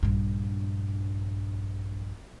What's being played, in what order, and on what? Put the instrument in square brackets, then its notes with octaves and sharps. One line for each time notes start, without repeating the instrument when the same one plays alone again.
[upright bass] A#1 G2